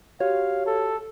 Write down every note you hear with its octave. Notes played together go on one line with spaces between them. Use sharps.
F#4 G4 C#5 F5
A4